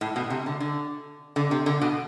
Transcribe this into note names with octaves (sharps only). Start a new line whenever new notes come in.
A2
B2
C3
D3
D3
D3
C3
D3
B2